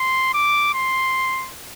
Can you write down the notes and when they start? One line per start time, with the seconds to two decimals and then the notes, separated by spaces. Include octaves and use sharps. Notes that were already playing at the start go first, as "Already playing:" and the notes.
Already playing: C6
0.34 D6
0.74 C6